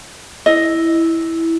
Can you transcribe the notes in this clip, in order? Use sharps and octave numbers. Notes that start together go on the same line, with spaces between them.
E4 D#5